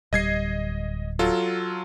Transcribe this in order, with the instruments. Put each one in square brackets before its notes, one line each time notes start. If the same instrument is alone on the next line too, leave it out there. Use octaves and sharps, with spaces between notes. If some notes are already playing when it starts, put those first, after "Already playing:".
[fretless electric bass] D1 G3 [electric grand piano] D#5 G#6 C7
[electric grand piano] F#3 F4 A4